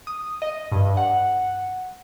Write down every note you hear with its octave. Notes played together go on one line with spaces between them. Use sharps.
D#6
D#5
G2
F#5